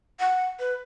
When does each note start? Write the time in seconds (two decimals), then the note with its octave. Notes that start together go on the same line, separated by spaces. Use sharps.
0.20 F#5
0.59 B4